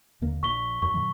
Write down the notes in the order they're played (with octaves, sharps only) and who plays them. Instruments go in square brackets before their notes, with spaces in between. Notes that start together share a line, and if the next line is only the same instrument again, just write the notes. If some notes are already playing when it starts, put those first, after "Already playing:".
[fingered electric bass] D#2 D3 A#3
[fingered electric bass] A#1 [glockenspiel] C#6 B6 G7
[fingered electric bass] F#2 [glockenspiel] C#6
[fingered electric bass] A#2 D#3 F#3